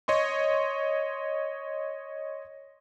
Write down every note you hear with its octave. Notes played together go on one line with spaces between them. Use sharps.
C#5 D#5 C6 C#6